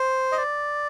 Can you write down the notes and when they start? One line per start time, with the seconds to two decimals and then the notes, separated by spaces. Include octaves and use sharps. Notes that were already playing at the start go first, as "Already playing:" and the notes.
Already playing: C5
0.32 D#5
0.37 D5